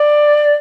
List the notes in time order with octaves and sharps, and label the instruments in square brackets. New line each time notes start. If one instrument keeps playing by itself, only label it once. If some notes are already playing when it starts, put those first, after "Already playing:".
Already playing: [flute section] D5